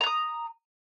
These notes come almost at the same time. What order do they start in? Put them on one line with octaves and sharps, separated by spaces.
A#5 F#6 D#6